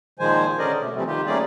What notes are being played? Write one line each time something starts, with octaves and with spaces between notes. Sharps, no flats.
A#2 D#3 F3 G#3 C5 G#5
D3 C#4 G#4 A#4 D5 D#5
B2 A3
C3 E3 F3 G3 A3 C4
D#3 F4 G4
G3 A3 A#3 C#4 G#4 D5